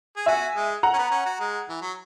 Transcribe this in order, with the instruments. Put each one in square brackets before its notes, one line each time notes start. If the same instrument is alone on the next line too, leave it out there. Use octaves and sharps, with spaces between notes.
[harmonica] G#4
[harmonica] F#4 [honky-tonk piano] E5 G#5
[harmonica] G#3
[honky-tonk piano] F#5 A#5
[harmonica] C#4
B3
C#4
F#4
G#3
E3
F#3